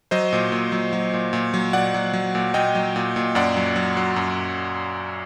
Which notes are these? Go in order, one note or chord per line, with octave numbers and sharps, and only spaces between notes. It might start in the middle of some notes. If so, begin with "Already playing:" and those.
F#3 C5 D#5
A#2
A#2
F#3
F#3
A#2
A#2
F#3
A#2 D5 F#5
F#3
F#3
A#2
A#2 D#5 G5
F#3
A#2
A#2
F#2 D5 F#5
F#3
F#3
F#3
F#2